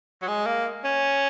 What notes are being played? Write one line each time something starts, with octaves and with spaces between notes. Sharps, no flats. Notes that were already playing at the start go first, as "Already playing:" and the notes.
F#3
G#3
A#3
C#4